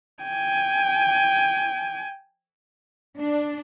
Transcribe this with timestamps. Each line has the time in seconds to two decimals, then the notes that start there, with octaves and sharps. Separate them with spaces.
0.23 G5 G#5
3.19 D4